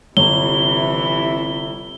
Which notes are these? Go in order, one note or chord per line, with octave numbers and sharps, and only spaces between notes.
G1 C3 E3 E4 G7